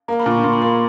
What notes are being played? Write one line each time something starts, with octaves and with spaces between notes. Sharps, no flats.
A#3 A#5
B5
A#2
C#6
A#2 C6
B5
A#3 C6
B5